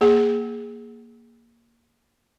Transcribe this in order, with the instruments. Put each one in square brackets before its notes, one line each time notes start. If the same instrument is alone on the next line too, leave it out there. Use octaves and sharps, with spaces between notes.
[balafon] A#3 G#4 F#5